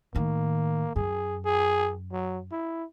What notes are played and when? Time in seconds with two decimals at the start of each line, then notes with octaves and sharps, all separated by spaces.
0.15 A2 D#3 A#3
0.96 F#2 G#4
1.45 G#4
2.12 F#3
2.52 E4